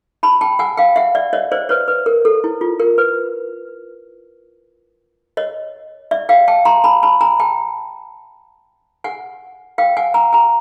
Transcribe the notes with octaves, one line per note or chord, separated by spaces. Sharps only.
A5 B5
G5 A5
F#5 G#5
F5 G5
E5 F#5
D5 E5
C#5 D#5
C5 D5
B4 C#5
B4
A#4
A4
E4
F4
A#4
B4
C#5 D#5
D5 E5
F5 G5
G5 A5
A#5 C6
A5 B5
A5 B5
G#5 A#5
G5 A5
F#5 G#5
F5 G5
F#5 G#5
G#5 A#5
G#5 A#5